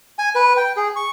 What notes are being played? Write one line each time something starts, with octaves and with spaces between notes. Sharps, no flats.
G#5
B4
G5
G#4
C#6